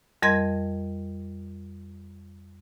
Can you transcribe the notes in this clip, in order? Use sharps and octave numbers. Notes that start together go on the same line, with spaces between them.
F2 G3 A#4 D#5 C6 G#6